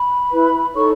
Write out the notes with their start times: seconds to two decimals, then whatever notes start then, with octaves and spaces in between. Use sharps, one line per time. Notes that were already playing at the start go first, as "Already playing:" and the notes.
Already playing: B5
0.31 E4 B4
0.74 D#4 A4 C#5 C#6